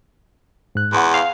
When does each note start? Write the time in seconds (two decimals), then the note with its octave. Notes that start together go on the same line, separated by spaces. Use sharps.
0.75 G#2 F#6
0.93 E2 F#5 C6
1.14 F5